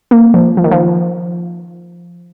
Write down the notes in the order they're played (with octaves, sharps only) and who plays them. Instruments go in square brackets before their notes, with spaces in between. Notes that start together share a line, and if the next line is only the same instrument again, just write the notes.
[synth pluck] A#3
F3
F3
D#3
F3